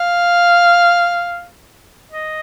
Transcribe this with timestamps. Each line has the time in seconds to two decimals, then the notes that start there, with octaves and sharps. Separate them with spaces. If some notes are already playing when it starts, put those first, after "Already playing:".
Already playing: F5
2.11 D#5